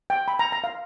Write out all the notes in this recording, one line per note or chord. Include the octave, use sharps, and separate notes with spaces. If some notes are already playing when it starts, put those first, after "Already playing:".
G5
B5
A#5
A#5
F5